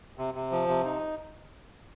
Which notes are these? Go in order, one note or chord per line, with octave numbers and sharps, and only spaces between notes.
C3
C3
F3
C3
D#4